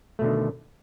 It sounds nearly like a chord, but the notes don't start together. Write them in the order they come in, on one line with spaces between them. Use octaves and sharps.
A3 B2 D3 D#3